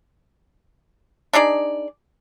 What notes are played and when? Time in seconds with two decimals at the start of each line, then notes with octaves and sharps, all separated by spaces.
1.33 D4 D#4 G#4 D5